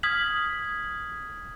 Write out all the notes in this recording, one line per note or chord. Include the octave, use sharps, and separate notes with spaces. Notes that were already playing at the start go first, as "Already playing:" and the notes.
D#6 F6 G#6 B6 F#7